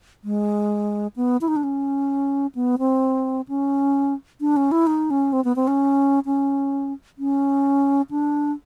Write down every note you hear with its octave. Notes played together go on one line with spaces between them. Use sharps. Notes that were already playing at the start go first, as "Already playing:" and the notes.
G#3
B3
E4
D#4
D4
C#4
B3
C4
C#4
D4
C#4
E4
D#4
C#4
C4
B3
C4
C#4
C#4
C#4
D4